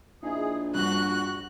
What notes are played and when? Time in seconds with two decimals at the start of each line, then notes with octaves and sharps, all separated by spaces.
0.23 A#1 D#4 E4 G#4
0.74 G2 F#4 F#6